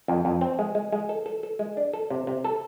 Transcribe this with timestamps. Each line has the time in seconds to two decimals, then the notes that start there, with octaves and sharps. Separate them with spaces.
0.08 F2
0.25 F2
0.41 C4
0.59 G#3
0.75 G#3
0.92 G#3
1.09 A4
1.26 A4
1.43 A4
1.59 G#3
1.77 D4
1.93 A4
2.10 C3
2.27 C3
2.44 A4